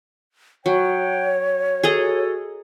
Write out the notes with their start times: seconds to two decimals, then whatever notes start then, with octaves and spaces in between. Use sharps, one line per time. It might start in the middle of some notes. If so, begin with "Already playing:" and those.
0.66 F#3 C#5 F#5 G5
1.83 F#4 G#4 A4 D#5 A#5